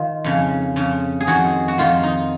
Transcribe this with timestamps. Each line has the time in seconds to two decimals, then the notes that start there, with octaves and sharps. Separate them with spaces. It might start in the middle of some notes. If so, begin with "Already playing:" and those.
Already playing: D#3 F4
0.24 F2 C#3
0.76 F2 C#3
1.21 G#4
1.27 F2 D#3 F#4
1.68 F#4
1.78 F2 D#3 F4
2.03 D#4